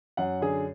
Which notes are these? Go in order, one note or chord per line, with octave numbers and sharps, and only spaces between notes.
F#2 F#5
D3 G#4